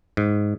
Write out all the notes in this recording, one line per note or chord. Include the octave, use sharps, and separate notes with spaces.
G#2